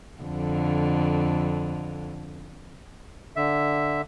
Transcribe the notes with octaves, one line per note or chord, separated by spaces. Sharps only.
F2 D3
D3 E5